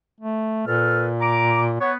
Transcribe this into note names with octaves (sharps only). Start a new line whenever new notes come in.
A3
A#2 A4 B4 F6
A#5 D6
B3 C#5